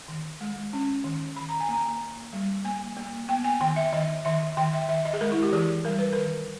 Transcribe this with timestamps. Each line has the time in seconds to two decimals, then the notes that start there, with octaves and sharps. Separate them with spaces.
0.08 D#3
0.41 G#3
0.73 C#4
1.04 D#3
1.36 D#3 B5
1.49 A#5
1.60 G#5
1.69 A#3 A#5
2.01 A#3
2.33 G3
2.65 A#3 G#5
2.97 A#3
3.28 B3 G5
3.44 G#5
3.61 D#3 G5
3.76 E5
3.93 D#3 D#5
4.25 D#3 E5
4.57 D#3 G5
4.73 E5
4.89 D#3 E5
5.05 D#5
5.13 G#4
5.21 G#3 A#4
5.32 E4
5.43 G4
5.52 E3 G#4
5.85 G3 A#4
5.99 B4
6.13 D#3 A#4